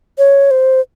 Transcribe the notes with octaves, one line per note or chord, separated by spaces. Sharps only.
C#5
C5